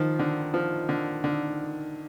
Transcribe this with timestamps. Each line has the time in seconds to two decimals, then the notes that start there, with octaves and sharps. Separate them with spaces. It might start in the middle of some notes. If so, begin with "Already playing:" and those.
Already playing: D#3 F3
0.19 D3
0.54 F3
0.89 D3
1.24 D3